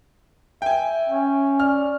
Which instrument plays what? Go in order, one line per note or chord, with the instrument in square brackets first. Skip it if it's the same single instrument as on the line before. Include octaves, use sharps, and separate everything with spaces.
[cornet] E5 [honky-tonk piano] G5 G#5
[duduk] C#4
[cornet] D5 [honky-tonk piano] F6